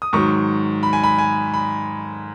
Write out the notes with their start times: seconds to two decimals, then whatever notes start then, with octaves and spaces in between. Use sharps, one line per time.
0.02 D#6
0.13 G#2 D#3 F#3 C#6
0.83 B5
0.93 G#5
1.04 B5
1.18 G#5
1.54 B5